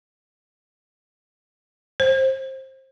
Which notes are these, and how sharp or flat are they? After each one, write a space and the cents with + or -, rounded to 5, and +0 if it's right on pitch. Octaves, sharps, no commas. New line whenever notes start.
C5 +20